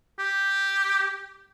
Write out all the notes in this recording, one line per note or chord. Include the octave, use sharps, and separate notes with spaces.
G4